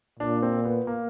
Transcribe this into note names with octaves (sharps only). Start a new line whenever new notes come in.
A#2 D4
C4
B3
A#3